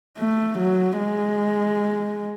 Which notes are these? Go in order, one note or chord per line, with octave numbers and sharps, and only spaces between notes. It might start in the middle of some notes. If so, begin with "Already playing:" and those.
A3
F#3
G#3